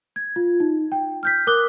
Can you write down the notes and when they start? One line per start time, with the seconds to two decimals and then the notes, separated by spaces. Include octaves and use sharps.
0.16 G#6
0.36 F4
0.60 D#4
0.92 G5
1.23 F6 G6 B6
1.47 A#4 D6 D#6 F#6 G7